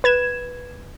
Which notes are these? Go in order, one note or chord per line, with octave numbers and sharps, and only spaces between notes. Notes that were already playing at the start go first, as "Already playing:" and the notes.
B4 G#6 E7